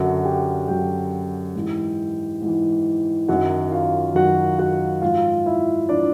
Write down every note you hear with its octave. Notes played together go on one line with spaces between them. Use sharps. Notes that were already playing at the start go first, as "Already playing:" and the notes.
Already playing: F#2 D3 F#3 F#4 F#5
G4 G5
F#2 D3 F#3 G4 G5
G#2 E3
G#2 E3
F#2 D#3 F#3 F#4 F#5
F4 F5
F#2 D#3 F#3 F#4 F#5
F#4 F#5
G#2 F3 F4 F5
E4 E5
F3 D4 D5